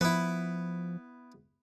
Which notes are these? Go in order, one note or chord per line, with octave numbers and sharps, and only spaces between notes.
F3 B3 E4